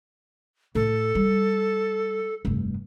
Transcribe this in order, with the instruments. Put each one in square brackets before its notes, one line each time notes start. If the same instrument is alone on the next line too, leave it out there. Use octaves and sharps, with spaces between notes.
[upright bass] A2 [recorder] A4
[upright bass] G3
F1 G2